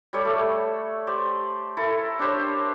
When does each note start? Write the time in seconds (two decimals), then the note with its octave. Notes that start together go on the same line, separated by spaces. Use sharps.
0.13 G3 A4 C#5 D5
0.25 A3
1.07 G4 C5 D5
1.77 E4 A4 A#4
2.19 D4 G4 C5 C#5